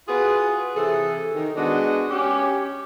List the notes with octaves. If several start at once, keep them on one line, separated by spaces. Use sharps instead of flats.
F4 F#4 G#4 B4
C3 E3 G#4 A4
D#3
G#3 B3 D4 F#4 D#5
C#4 G4